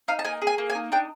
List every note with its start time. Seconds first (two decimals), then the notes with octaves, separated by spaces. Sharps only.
0.08 D#4 F5
0.19 A5
0.25 A#3 G#5
0.42 G#4
0.47 G#5
0.58 A#3
0.70 G#5
0.75 D#4
0.92 D4 G5